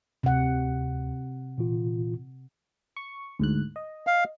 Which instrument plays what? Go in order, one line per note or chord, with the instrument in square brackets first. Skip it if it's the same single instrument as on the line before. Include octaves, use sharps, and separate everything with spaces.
[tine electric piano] D2 [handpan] C3 F#5
[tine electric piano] A#2 E3 F4
[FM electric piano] C#6
D2 G#2 F#6
D#5
[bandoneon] F5